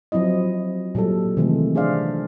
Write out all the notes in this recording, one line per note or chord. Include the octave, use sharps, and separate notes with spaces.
F3 F#3 C4 E4 D#5
A#2 F#3 G3 A4
C3 D#3 E3 G#3 A3
D4 G#4 C5 D5 E5 F5